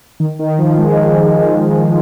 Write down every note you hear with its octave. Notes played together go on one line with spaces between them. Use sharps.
D#3
D#3
F3
G#3